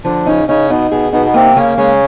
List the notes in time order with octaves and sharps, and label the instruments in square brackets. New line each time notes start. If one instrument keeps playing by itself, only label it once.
[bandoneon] D3 D4 [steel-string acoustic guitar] F3
[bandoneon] C#3 C#4 [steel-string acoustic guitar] D#4
[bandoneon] C#3 C#4 [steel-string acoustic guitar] D#4
[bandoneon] B2 B3 [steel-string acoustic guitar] D#4
[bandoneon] B2 B3 [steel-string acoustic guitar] G#4
[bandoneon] B2 B3 [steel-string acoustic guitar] D#4
[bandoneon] B3
[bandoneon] C3 C4 [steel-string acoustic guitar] A#3
[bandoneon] C#3 C#4 [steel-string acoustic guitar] A#3
[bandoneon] C#3 C#4 [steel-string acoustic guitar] G#3